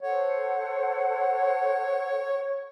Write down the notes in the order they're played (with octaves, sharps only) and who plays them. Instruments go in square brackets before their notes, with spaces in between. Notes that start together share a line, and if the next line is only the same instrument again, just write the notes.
[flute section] A4 C5 F#5 [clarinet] C#5